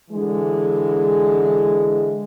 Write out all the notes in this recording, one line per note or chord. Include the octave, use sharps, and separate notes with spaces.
D3 E3 G#3